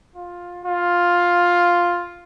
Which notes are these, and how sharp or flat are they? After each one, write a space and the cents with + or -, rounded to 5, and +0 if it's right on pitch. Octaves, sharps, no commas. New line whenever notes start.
F4 +15
F4 +5